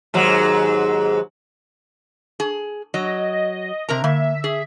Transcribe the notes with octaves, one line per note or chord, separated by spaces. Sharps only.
D#2 G#2 F#3
G#4
F#3 D#5
C3 A#4 A#5
D3 A#3 E5
G#4